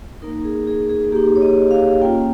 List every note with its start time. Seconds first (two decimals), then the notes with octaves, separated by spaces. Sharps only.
0.22 A#3 D#4 A#4
0.44 G#4
0.67 G#4
0.89 G#4
1.12 A#3 D#4 G4
1.36 C#5
1.42 D#5
1.71 F5
2.02 A#3 C#4 F4 G5